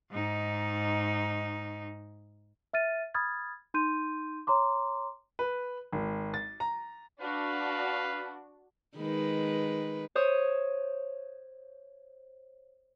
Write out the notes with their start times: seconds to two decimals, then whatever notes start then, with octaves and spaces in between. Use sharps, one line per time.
0.11 G#2 D#4
2.73 E5 F6 A6 D#7
3.14 B5 D#6 F6 G#6 A6
3.74 D#4 C6 G6 D#7
4.47 C#5 A#5 C6 D6
5.39 B4
5.92 G#1
6.34 A6
6.60 A#5
7.21 D4 F#4 B4 F5
8.97 D#3 G#3 B4
10.15 C5 C#5 D#6